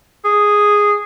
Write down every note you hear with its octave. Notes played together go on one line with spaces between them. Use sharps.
G#4